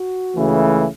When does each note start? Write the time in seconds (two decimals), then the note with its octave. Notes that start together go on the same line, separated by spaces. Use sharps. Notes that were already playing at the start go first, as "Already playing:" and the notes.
Already playing: F#4
0.36 C#2 C#3 E3 A3